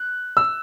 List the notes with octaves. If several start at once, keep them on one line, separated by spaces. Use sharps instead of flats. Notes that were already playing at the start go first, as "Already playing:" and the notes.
Already playing: F#6
E6